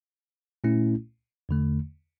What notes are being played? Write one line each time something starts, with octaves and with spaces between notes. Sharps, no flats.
A#2 A3 C#4 E4
E2 D3 A3